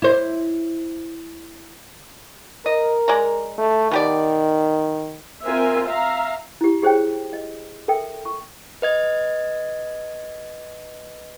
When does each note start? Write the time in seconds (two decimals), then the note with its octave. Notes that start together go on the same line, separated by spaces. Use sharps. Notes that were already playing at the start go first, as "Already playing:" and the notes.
0.02 E4 C5
2.66 A#4 D#5
3.08 G#3 D5 A#5
3.58 A3
3.91 B2 D#3 G4 D5
5.43 C4 F4 A#4 E5 G#5
5.86 E5 F5 A#5
6.61 E4 G4
6.82 G4 G#4 C5 C#5 G5
7.33 D#5
7.88 A4 A#4 E5 G5
8.25 C#6
8.82 B4 D#5 G#6